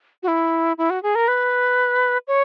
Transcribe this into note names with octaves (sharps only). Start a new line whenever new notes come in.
F#4
E4
E4
F#4
G#4
A#4
B4
C#5